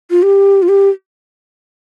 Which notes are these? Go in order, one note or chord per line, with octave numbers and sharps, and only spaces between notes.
F4
G4
F4
G4